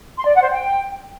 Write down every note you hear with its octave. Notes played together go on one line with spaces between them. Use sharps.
C6
D5
F#5
C5
G5